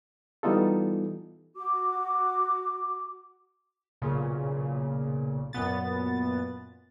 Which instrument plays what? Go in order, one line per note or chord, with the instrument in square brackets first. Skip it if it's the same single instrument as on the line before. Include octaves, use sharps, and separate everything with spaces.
[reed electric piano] E3 G3 B3 D#4 F4 A4
[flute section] F#4 D6
[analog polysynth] B1 A#2 C#3
F#2 A#2 B3 A6